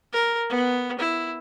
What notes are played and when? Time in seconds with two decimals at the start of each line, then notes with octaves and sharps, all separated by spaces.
0.13 A#4
0.50 B3
0.99 E4